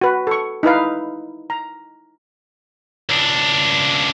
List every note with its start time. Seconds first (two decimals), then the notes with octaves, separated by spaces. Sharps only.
0.01 F#4 B4
0.27 A4 C#6
0.63 D#4 E4 B4 F5
1.50 A#5
3.10 C#2 D4